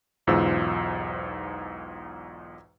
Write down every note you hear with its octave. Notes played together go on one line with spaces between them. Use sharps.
B1 E2 G#2 F4 C5 E6